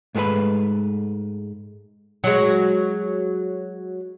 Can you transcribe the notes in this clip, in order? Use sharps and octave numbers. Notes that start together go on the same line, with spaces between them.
G#2 G#3 A3 F#4 B4 B5
F#3 G#3